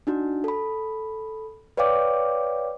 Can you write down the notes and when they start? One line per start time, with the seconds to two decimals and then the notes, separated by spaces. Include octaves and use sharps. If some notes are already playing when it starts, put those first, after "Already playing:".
0.07 D4 D#4 F#4
0.44 A4 B5
1.77 B4 C#5 D5 F5 G5 D6